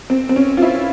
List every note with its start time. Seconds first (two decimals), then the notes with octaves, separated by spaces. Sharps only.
0.10 C4
0.29 C4
0.36 C#4
0.57 F4
0.62 E4